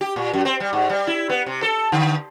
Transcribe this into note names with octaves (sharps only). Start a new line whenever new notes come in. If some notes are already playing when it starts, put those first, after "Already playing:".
G4
A#2
F#2
C4
G3
G#2
G3
E4
B3
C3
A4
D3